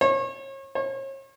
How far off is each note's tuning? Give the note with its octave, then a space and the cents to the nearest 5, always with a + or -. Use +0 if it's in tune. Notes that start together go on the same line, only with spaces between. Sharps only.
C#5 -35
C#5 -40